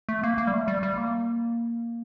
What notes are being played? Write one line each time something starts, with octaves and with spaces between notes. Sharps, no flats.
A3
A#3
A#3
G3
A3
G3
G3
A#3